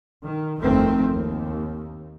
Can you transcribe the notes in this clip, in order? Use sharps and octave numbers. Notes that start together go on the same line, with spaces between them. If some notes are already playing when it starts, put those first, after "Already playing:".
D#3
G1 F2 D#3 A3 C4
D#2